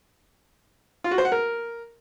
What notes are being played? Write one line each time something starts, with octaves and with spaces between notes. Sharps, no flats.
F4
F#4
C5
F#5
A#4